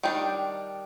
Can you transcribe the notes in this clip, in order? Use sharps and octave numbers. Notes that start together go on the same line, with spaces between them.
D#3 G3 D4 G5